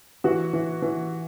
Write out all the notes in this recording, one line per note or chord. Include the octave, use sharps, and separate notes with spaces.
E3 F#4
E3
E3